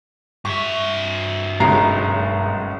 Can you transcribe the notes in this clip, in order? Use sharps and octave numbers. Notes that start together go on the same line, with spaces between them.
G2 E5 C#6
F#1 B1 G#3 A#5 C7